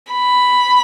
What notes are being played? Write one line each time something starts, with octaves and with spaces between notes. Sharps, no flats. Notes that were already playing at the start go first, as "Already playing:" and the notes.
B5